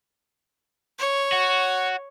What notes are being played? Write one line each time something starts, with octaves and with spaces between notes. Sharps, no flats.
C#5
F#4